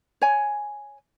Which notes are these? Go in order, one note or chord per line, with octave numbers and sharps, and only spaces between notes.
C#5 G#5